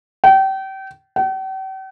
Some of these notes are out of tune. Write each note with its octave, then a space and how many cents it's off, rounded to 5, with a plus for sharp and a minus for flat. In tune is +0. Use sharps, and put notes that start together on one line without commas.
G5 -30
G5 -45